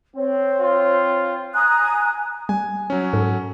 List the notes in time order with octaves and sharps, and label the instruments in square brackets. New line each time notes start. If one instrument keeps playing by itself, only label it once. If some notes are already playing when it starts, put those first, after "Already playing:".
[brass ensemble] C4 [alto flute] C#5
[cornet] F4
[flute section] G#5 A#5 D#6 F#6
[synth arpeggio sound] G3 [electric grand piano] G#5
[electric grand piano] F#3 C#4
[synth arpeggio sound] G#2 A4